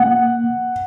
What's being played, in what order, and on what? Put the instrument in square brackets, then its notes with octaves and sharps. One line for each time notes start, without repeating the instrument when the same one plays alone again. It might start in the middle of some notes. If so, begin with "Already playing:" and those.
Already playing: [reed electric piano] A#3 [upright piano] F#5